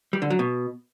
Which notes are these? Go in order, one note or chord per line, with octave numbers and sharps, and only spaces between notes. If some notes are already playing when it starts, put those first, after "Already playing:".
G3
D3
F#3
B2